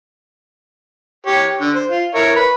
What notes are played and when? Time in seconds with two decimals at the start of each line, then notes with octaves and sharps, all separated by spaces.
1.27 G4 C#5
1.61 D3
1.75 C5
1.91 F4
2.15 E4 A#4 C#5
2.36 B4 B5